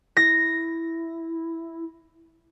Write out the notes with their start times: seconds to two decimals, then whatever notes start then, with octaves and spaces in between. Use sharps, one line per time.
0.17 E4 A#6